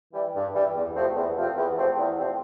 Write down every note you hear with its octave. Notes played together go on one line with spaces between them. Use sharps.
E3 G3
G2
E3 G3
E2
C3 F3 A3 C4
E2
C3 F3 A3 C4
E2
C3 F3 A3 C4
E2
C3 F3 A3 C4